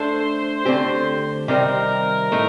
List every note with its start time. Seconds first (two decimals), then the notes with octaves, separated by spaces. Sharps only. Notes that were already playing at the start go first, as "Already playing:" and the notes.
Already playing: A3 D4 A4 C5
0.65 D3 A3 C4 G4
1.48 C3 D#3 G3 C4 D#4 A#4
2.32 A2 A3 D#4